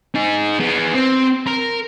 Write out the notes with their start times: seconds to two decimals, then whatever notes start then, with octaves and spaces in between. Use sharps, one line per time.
0.15 D#4 G#4
0.60 B3 G#4
0.94 C4
1.47 A#4